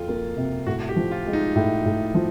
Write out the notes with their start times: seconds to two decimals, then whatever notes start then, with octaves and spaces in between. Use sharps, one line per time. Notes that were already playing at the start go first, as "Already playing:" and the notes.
Already playing: F2 F4
0.08 A#3
0.36 C3
0.67 A2 F#4
0.89 G4
0.96 F3
1.11 F4
1.26 G#3
1.33 D#4
1.56 A2
1.85 A2
2.15 F3